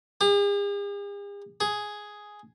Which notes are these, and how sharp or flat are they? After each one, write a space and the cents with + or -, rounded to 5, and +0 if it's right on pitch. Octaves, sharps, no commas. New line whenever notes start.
G#4 -45
G#4 +5